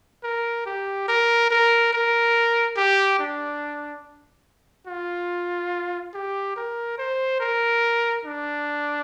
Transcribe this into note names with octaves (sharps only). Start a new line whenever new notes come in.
A#4
G4
A#4
A#4
A#4
G4
D4
F4
G4
A#4
C5
A#4
D4